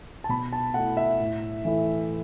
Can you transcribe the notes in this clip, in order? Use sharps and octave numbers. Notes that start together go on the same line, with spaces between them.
A5
B2 B5
A5
A3 E4 F#5
E5
A2
E3 A3 E4